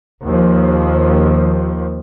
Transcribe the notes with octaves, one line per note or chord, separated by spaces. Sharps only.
D#2 F3